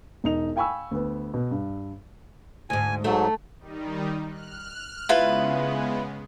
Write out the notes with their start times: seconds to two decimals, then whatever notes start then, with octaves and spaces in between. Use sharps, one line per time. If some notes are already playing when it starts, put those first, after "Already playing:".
0.24 E1 D#4 F7
0.56 F5 G5 G#5 B5 C#6 E6
0.91 D2 B3
1.34 B2
1.51 G2
2.70 D2 G#2 G#5
3.04 G#2 F#3 A3
3.60 D#3 G3 D#4
4.29 F6 F#6
5.09 C#3 G#3 B3 E4 F4 B4